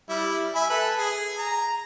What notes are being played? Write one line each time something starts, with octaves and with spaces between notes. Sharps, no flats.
G3 E4
E5 G#5 B5
A4 B4
G#4
A#5